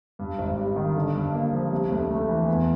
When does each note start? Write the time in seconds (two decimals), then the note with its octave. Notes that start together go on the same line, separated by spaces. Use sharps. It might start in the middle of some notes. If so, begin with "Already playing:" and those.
0.19 G2
0.38 G#1
0.57 G3
0.76 D#3
0.96 D3
1.15 G2
1.33 A#3
1.53 F3
1.72 C3
1.91 D2
2.10 A3
2.28 E3
2.47 E2